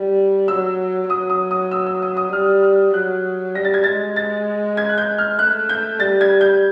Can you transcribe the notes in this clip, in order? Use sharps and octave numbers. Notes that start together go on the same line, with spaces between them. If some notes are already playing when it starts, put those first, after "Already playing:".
Already playing: G3
F#3 E6
F#3 D#6
D#6
D#6
E6
E6
D#6
D#6
G3 F6
F6
F#3 F#6
G3 A#6
A6
G#6
G#3 A6
A6
G#6
F#6
G6
F6
A3 F#6
G6
G3 A6
G#6
G6